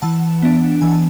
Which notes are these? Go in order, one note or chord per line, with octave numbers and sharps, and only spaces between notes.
E3 F#5 A5
B3 D4
E3 G#5
A5